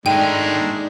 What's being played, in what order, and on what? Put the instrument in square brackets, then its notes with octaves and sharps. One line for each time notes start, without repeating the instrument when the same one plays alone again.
[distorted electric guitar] G#2 A#4 [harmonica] G#3 A3 D4 [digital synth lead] D#4 [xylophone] G5 D#7